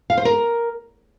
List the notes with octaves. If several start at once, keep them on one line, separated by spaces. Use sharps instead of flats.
F5
C5
A#4